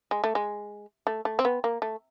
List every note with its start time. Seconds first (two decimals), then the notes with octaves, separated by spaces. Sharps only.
0.11 G#3
0.24 A3
0.35 G#3
1.07 A3
1.25 A3
1.39 C4
1.45 B3
1.64 A#3
1.82 A3